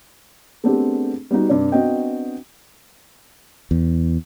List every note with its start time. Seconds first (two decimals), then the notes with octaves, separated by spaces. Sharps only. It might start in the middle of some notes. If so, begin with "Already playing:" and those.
0.64 A3 B3 C4 D4 G4 G#4
1.31 G3 B3 D#4 F#4
1.49 G2 C3 D5
1.72 B3 C4 D4 F#4 D#5 G5
3.71 E2